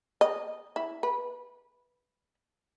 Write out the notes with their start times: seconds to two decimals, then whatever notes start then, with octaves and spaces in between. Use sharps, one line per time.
0.21 D#5
0.76 E4
1.03 B4